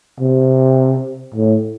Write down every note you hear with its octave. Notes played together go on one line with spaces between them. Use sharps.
C3
A2